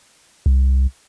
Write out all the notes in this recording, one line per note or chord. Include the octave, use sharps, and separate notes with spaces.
C2